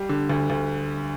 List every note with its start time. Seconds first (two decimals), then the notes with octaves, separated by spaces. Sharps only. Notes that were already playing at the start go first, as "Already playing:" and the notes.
Already playing: G3
0.09 D3
0.30 D2
0.50 D2